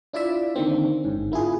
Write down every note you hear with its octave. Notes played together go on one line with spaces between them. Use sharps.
D4 E4 F4 D5 E5
D3 D#3 A#3 C4 D4
G1 G#2 C#4
A#3 E4 F4 G#4